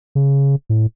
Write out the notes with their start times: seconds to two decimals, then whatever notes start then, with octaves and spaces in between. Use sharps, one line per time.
0.15 C#3
0.69 A2